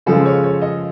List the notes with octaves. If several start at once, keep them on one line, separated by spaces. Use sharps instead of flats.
C#3 F3 G#3 A4
C#5
C#5
D#5